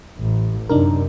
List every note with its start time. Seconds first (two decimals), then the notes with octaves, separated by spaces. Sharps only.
0.17 A1
0.69 F#2 C3 D4 D#4 A#4